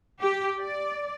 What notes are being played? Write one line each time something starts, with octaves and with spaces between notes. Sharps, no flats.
G4
D5